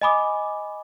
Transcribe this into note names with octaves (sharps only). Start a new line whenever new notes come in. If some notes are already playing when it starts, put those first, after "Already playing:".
D#5 G#5 B5 D6 D#6